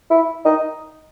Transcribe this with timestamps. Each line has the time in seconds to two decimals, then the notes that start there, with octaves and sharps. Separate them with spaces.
0.11 E4
0.45 D#4